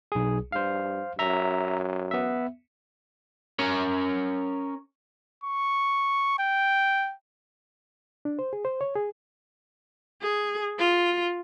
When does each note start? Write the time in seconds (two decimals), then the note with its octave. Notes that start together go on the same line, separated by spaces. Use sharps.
0.12 B1 G#4
0.52 G2 C5 F5
1.19 F#2 E5 A#5
2.11 B3 E5
3.59 C#4 A#4 C#5
5.44 C#6
6.39 G5
8.25 D4
8.39 C5
8.53 G#4
8.65 C5
8.81 C#5
8.95 G#4
10.21 G#4
10.79 F4